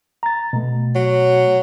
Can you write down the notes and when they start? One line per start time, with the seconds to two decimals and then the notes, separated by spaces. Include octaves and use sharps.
0.23 A#5 A6
0.53 B2 A3
0.95 F#3